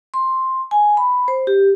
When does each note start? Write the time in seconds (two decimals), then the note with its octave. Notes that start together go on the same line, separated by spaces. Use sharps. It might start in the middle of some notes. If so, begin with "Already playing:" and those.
0.14 C6
0.71 G#5
0.97 B5
1.28 C5
1.47 G4